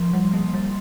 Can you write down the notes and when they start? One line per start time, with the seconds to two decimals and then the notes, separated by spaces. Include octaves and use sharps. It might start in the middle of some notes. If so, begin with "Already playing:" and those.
Already playing: F3 C6
0.13 G3
0.33 A#3
0.54 G3